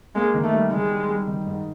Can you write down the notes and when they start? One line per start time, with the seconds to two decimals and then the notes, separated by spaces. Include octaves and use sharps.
0.15 G#3 A#3
0.34 D#3
0.44 A3
0.53 G3
0.71 D#3 G#3
0.90 G3
1.09 G3
1.27 D#3
1.47 G#2